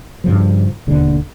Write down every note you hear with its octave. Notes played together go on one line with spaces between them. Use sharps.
G2 C#3 F3
E1 D#2 D3